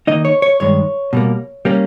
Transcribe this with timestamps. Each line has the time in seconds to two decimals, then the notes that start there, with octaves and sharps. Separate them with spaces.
0.07 D#3 A#3 D#4 D#5
0.25 C#5
0.42 C#5
0.60 G2 D#3 G#3 C#5
1.13 B2 G3 A#3
1.65 G3 A#3 C#4